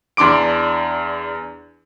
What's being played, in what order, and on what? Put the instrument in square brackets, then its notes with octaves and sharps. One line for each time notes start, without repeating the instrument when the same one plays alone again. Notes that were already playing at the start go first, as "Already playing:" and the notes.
[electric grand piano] E2 D4 C6 D6 D7